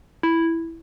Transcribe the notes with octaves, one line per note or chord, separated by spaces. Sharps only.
E4